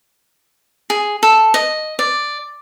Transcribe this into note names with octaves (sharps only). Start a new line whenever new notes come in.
G#4
A4
D#5
D5